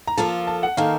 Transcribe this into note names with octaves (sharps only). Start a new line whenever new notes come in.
A#5
F3 A#3 F4 A4 A5
A5
F#5
D#3 A#3 D#4 A4 F5